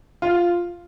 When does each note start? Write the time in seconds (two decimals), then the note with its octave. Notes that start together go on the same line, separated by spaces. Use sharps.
0.22 F4